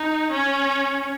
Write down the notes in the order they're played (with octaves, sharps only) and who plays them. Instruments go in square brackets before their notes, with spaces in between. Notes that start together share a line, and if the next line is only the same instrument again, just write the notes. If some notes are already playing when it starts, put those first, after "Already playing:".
Already playing: [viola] D#4
C#4